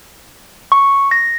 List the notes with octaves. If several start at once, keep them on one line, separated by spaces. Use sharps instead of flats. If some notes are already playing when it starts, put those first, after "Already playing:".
C#6
A#6